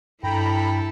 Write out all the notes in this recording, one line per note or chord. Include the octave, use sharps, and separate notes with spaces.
G2 E4 A4 G5 A#5 B5